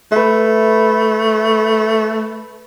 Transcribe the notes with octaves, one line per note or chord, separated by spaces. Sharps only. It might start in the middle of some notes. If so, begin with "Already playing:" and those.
A3 B4 E5